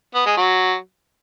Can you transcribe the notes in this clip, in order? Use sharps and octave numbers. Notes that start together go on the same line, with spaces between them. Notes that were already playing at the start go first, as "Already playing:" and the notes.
B3
G#3
F#3